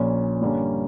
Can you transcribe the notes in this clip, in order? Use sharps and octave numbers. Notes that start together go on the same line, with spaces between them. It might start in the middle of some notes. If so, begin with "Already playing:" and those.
Already playing: A#1 A#2 A#3 C#4
G2 D3 G3 A#3 C#4